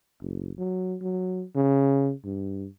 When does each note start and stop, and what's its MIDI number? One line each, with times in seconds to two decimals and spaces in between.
0.22 0.51 30
0.58 0.96 54
1.02 1.44 54
1.55 2.12 49
2.25 2.67 43